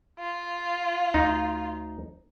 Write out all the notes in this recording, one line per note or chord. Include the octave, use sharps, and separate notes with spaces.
F4
D2 D#4